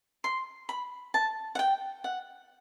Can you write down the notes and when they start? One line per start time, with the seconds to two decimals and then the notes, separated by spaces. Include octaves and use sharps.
0.24 C6
0.69 B5
1.14 A5
1.55 F#5
1.59 G5
2.04 F#5